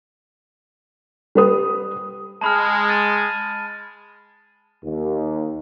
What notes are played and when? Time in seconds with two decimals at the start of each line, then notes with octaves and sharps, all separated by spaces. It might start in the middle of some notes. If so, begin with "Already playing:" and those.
1.35 G3 B4 D#6
2.41 G#3 A5 B5 F6
2.89 A6 D#7
4.84 D#2